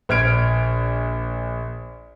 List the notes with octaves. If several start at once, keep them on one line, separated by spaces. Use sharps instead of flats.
A#1 F6 G#6 D7